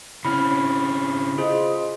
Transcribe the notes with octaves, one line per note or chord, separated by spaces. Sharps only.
C#3 C4 C#4 E4 B5 F6
F4 G#4 C5 D#5